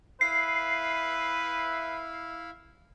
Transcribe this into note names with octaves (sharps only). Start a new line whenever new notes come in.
E4 B4 E5 F5 C7